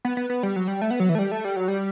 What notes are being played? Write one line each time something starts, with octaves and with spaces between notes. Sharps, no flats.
B3
B3
B3
G3
F#3
G3
A3
B3
F#3
E3
A3
G3
A3
G3
F#3
G3